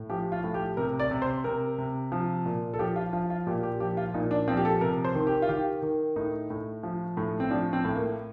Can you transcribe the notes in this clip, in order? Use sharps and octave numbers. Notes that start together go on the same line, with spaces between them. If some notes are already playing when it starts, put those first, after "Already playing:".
Already playing: A2
F3 G4
F4
A2
G4
C3 A#4
D5
C3
C5
C3 A#4
C3
F3
A#2
A4
F3 G4
F4
F3 F4
F4
A#2 G4
G4
F3 G4
F4
A#2 D#4
D4
F3 C4
G4
A4
C3 A#4
C5
D#3
G4
F4
D#3 G4
D#3
A2 D#4
A2
F3
A2
C4
F3 D4
C4
A2
A#3